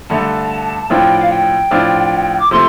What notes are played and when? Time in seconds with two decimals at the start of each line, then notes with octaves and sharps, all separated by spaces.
0.10 G2 D3 A3 A5
0.90 A2 F3 D4 F4 G5
1.20 F5
1.30 G5
1.71 A2 F3 D4 F4
2.39 D6
2.51 C3 F3 A3 C6